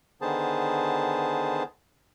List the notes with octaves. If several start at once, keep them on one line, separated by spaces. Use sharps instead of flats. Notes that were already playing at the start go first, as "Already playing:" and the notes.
D3 D#3 B3 G#4 C5 A5